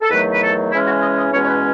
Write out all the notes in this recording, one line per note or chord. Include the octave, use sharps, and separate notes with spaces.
A4
E2 D#3 F#3 A3 B4
B4
A4
C#3 E3 G#3 C#4 E4
F#4
D#5
D#5
E2 B2 G#3 C#4 C#5
C#5
B4